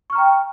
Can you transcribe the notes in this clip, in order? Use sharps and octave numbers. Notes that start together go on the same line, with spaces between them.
G5 A#5 C#6 F6